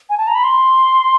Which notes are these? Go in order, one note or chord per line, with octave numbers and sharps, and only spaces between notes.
G#5
A5
A#5
B5
C6